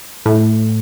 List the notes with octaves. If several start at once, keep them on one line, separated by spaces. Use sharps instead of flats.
A2